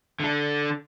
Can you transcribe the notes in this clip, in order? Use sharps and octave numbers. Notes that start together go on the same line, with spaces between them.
D3 A4